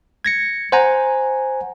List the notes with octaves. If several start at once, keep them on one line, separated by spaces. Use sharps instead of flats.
G#6 A#6 C#7
C5 F#5 G#5 A#5